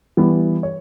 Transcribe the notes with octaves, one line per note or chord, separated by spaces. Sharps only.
E3 G3 B3
C#5